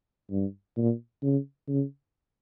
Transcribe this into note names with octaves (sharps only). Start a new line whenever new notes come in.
G2
A#2
C#3
C#3